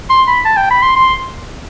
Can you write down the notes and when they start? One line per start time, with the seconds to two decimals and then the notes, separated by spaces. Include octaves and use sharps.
0.10 C6
0.27 B5
0.45 A5
0.57 G5
0.71 B5
0.83 C6
0.96 C6